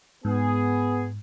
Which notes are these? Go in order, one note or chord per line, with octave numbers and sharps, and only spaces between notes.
G#2 B3 G#4